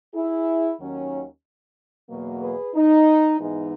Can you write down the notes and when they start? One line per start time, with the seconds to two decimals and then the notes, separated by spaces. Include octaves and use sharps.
0.14 E4 G#4
0.79 D#2 D#3 F#3 C#4
2.09 E2 B2 F#3 A#3
2.41 G#4 B4
2.75 D#4
3.40 G#2 E3 G#3 B3 D#4